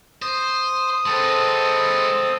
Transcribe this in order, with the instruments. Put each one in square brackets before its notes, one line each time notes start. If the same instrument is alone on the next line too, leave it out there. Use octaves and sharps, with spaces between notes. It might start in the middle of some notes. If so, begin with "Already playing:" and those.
[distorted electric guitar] C5 [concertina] D#6
[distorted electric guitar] G#3 B4 [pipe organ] C4 A4